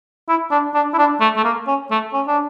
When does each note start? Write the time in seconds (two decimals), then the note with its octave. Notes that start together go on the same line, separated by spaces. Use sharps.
0.29 E4
0.51 D4
0.75 D4
0.93 E4
0.98 D4
1.21 A3
1.36 A3
1.44 A#3
1.67 C#4
1.91 A3
2.13 C#4
2.27 D4